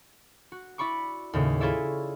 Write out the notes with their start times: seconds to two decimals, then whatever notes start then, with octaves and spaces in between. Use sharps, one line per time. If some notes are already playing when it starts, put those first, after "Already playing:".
0.52 F#4
0.78 E4 D5 B5 C#6 D6
1.33 D#2 A2 C#3
1.61 E4 F4 G#4 C#5 D5 E5